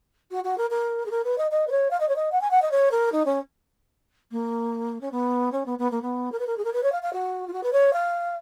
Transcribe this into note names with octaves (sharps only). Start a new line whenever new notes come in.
F#4
F#4
A#4
A#4
G#4
A#4
B4
D#5
D#5
B4
C#5
F5
D#5
C#5
D#5
F#5
G#5
F#5
D#5
C#5
A#4
D#4
C#4
A#3
C#4
B3
C#4
B3
B3
A#3
B3
A#4
B4
A#4
G#4
A#4
B4
C#5
F5
F5
F#4
F4
F#4
B4
C#5
F5